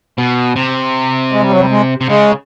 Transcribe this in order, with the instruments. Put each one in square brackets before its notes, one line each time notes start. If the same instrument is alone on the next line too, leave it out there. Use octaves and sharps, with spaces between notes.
[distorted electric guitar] B2
C3
[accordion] G#3
G3
F#3
G3
G#3
[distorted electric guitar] C3
[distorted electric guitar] C#3 [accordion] G#3